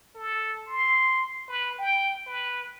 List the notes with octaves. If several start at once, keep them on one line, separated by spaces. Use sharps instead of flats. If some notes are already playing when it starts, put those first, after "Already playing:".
A4
C6
B4
G5
B4